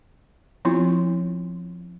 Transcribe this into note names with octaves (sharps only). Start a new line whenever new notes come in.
F3 B3 C4 E4 F4